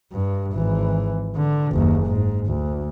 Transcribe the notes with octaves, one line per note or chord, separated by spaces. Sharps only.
G2
G#1 E3
D3
F#1 D#2
G#2
D2